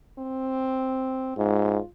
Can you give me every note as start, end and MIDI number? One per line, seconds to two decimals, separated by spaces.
0.19 1.37 60
1.38 1.79 44
1.38 1.86 65